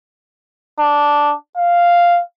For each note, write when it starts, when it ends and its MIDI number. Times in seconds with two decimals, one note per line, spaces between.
0.79 1.34 62
1.57 2.20 77